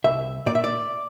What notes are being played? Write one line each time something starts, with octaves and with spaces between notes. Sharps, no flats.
C2 E5
A#2 D5
E5
D5